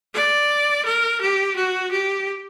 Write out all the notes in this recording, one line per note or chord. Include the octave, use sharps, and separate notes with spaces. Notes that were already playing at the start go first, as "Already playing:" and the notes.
D5
A#4
G4
F#4
G4